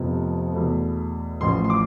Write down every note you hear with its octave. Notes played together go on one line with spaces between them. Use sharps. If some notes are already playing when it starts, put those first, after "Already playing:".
Already playing: F1 F2 C3 F3 B3
E2 B2 A3
A1 A2 F3 C6
C6
D6